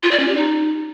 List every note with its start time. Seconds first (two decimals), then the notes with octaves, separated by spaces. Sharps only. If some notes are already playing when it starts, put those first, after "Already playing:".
0.03 F4
0.11 D5
0.20 C#4
0.28 G4
0.36 D#4